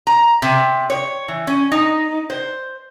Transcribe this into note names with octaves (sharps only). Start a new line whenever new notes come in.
A#5
C3
C#5
E3
C#4
D#4
C5